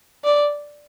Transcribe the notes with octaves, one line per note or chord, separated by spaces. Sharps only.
D5